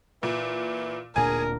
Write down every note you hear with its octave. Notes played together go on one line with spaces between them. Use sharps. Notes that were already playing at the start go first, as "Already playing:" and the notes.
A#2 E3
D1 A#2 D4 G#4 A#4 G#5